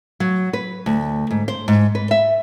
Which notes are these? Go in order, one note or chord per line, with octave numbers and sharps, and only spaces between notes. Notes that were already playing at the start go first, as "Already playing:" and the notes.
F#3
B4
D2
G#2
C5
G#2
B4
E5